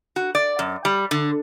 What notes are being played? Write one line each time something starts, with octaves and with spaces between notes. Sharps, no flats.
F#4
D5
F#2
G3
D3